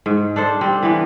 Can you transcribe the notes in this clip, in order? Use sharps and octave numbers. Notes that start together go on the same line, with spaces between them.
G#2
D4 A4 C5
G3 C4
E3 B3